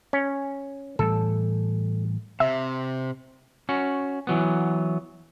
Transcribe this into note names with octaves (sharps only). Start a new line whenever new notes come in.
C#4
A2 E3 G3 A4
C3 E5
C#4 F#4
E3 F#3 B3